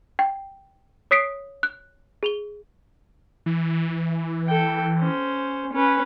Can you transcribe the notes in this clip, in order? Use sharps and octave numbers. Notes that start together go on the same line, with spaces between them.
G5
C#5 D#6 B6 C7 D7
F#6
G#4 F7 G7
E3
A4 G5
C#4 C5
C#4 B4